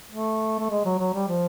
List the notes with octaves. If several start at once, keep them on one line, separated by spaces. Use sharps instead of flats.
A3
A3
G#3
F#3
F#3
G3
F3